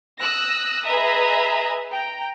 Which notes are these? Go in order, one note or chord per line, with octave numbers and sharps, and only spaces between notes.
D#6 E6 F#6 A#6
G#4 B4 D#5 E5 A#5 D#6
G5 A#5